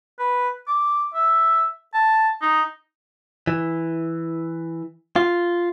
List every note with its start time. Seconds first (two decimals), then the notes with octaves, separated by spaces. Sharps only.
0.19 B4
0.67 D6
1.14 E5
1.94 A5
2.42 D#4
3.47 E3
5.16 F4